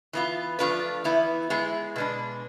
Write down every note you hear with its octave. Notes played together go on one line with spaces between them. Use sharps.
E3 B3 F4
F3 A3 D4 F4 B4
E3 B3 E4
G#3 B3 E4 G#4
B2 G#3 D4